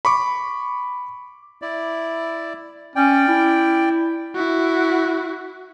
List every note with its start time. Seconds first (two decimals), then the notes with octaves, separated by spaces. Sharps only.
0.05 B5 C#6 D6
1.62 E4 D5
2.96 C#4 D5 G5
3.28 E4
4.35 E4 F#4